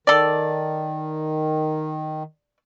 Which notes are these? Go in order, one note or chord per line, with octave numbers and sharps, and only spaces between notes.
D#3 A4 D5